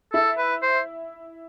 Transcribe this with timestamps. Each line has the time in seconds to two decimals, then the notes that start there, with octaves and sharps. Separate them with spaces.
0.14 E4 A4
0.38 B4
0.62 C5